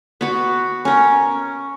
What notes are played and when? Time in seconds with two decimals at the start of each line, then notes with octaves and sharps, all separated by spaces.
0.21 B3 F#4
0.85 C#4 A#4